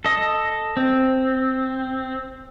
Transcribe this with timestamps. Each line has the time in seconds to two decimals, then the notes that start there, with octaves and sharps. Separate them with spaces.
0.05 A4 D#5
0.77 C4